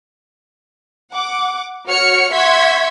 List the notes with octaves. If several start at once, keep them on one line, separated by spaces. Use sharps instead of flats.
F#5 D6
F#4 C#5 F6 C#7
E5 F#5 C6 C#6 G#6 B6